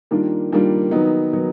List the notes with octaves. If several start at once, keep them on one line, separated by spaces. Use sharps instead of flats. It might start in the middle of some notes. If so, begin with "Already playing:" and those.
D#3 G3 A#3 D4 F4
D#3 G3 A#3 D4 F4
D#3 F#3 B3 D#4
D#3 F#3 B3 D#4